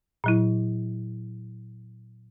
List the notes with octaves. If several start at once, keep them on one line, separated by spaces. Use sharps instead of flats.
A#2 F#3 E4